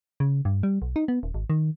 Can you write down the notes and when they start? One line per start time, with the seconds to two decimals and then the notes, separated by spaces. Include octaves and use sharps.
0.20 C#3
0.45 G2
0.63 G3
0.82 B1
0.96 D#4
1.08 B3
1.23 D#1
1.34 G#1
1.50 D#3